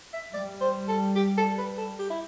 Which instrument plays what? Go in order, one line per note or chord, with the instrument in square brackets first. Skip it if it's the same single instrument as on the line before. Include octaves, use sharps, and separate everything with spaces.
[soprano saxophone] E5
[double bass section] G3 [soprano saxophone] D5
[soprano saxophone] C5
A4
G4
A4
B4
A4
G4
E4